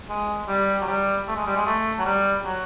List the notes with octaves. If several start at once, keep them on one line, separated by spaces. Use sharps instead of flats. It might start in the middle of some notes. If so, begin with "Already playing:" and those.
G#3
G3
F#3
G3
A3
G#3
G3
G#3
A3
F#3
G3
F#3